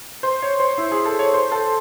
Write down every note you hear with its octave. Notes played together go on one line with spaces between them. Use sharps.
C5
C#5
C5
E4
G#4
A4
C#5
C5
A4